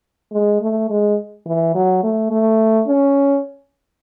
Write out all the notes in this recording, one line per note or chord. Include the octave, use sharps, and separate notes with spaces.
G#3
A3
G#3
E3
F#3
A3
A3
C#4